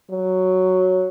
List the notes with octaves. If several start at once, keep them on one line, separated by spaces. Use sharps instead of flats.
F#3